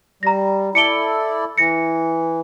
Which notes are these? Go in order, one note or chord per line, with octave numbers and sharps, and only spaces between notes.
G3 A#5 A#6
E4 A4 D5 C#7 D7 G7
E3 A#6 C#7